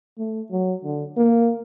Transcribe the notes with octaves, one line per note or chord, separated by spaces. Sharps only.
A3
F#3
D3
A#3